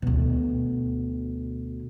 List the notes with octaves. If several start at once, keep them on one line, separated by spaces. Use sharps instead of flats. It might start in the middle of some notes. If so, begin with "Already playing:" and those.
D2 B2